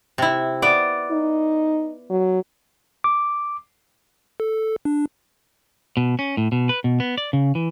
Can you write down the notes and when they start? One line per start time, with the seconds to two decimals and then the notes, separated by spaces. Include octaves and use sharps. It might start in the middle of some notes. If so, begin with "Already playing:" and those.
0.18 C3 E4
0.62 B3 D5
1.11 D#4
2.10 F#3
3.04 D6
4.40 A4
4.85 D4
5.97 B2
6.19 C#4
6.37 A2
6.52 B2
6.69 B4
6.84 B2
7.00 B3
7.18 D5
7.33 C#3
7.55 E3